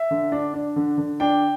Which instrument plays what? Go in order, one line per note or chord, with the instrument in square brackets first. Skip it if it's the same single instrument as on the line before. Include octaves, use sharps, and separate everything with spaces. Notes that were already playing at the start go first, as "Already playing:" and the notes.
Already playing: [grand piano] E5
D3
D4
D4
D3
D3
D4 G5